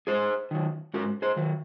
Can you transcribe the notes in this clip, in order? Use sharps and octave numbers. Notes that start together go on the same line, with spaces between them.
G#2 G#4 C5
D#3 F#3
G#2 F#4 A#4
G#4 C5
D#3 F#3